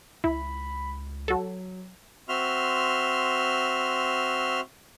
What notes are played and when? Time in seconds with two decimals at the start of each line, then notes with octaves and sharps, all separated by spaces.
0.24 C#2 E4 B5
1.28 F#3 F#4 A4
2.29 C4 F#4 E5 C6 F6